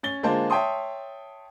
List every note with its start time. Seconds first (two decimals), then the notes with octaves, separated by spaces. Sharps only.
0.03 C#4 A6 G7
0.23 D3 G#3 A#3 F4 C5 A5
0.50 C#5 E5 G5 A5 C6 D#6